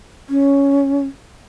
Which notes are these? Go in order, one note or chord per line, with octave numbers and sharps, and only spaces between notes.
C#4